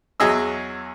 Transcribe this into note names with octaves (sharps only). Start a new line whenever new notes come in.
E2 F#3 G#4 D#5 E6